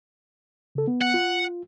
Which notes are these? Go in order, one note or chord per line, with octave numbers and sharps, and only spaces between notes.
C#3 A4
B3
F#5
F4